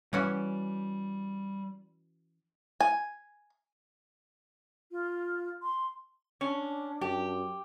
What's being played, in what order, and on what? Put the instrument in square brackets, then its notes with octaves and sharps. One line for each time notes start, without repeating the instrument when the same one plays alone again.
[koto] E3 C#4 F#4 [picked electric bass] G3
[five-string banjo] G#5
[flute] F4
C6
[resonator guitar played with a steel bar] C#4 [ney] D4
[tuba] F#2 [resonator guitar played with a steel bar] G4